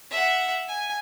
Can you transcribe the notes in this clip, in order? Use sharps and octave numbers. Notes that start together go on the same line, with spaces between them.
E5 F#5
G#5